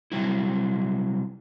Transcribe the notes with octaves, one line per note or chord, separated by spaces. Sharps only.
C3 F#3 G3 E4